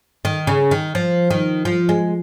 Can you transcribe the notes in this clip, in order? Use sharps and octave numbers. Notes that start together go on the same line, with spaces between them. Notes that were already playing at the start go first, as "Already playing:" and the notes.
D#3
C#3
D#3
F3
D#3
F3
G#3